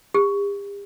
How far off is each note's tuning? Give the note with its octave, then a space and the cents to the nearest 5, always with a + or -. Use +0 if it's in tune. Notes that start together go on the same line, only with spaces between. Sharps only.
G4 +40